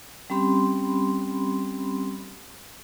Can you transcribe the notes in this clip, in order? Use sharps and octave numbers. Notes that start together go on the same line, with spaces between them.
G3 C4 C#4 G4 B5 C6